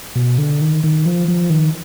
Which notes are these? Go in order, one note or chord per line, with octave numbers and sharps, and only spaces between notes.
B2
D3
D#3
D#3
F3
F3
D#3